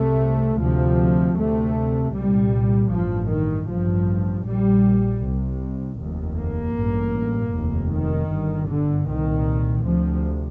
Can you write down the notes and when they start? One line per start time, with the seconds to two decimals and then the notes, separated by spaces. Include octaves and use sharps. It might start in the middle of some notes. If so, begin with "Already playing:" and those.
Already playing: C2 C3 A3
0.59 D2 C3 F3
1.37 D2 C3 A3
2.13 C2 A#2 G3
2.90 A1 G2 F3
3.29 D#3
3.67 A1 G2 F3
4.44 A#1 A#2 G3
5.22 C2 C3
5.99 F1 D#2
6.37 A#3
6.75 A1 G2
7.52 F1 D#2
7.91 D#3
8.31 G1 G2
8.68 D3
9.07 C2 A#2 D#3
9.84 D2 C3 F3